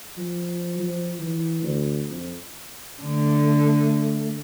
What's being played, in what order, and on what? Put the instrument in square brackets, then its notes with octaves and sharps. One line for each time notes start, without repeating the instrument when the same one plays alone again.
[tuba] F3
F3
E3
D2
F2
[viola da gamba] D3 [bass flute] A3